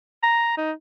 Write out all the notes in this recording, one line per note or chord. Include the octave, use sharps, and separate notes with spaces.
A#5
D#4